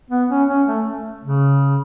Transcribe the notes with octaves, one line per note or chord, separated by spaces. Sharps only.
B3
C#4
C#4
A3
C#3